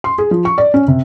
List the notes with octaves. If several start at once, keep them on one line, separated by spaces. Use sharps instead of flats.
C6
G#4
F3
C#6
D5
C#4
C3